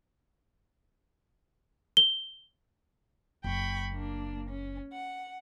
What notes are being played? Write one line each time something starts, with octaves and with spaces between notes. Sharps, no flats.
G7
F#1 G5 B5 C#6
A#3 D4
C#4
F#5